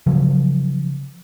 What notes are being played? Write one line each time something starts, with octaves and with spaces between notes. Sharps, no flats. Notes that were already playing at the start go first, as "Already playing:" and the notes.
C#3 F3 F#3